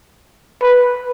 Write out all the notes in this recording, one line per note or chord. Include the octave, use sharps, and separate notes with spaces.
B4